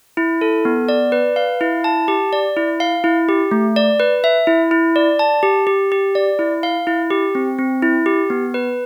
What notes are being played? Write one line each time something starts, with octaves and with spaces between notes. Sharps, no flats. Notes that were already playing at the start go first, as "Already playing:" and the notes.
E4
A4
B3
D5
B4
F5
E4
A5
G4
D5
E4
F5
E4
G4
A3
D5
B4
E5
E4
E4
D5
A5
G4
G4
G4
D5
E4
F5
E4
G4
C4
C4
E4
G4
B3
B4